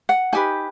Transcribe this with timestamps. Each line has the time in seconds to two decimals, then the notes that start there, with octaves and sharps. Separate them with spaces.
0.09 F#5
0.33 D#4 G4 B4 G#5